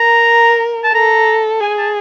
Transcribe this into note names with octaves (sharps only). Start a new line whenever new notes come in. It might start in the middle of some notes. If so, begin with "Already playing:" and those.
Already playing: A#4 A#5
A5
A4 A#5
G#4 G#5
A5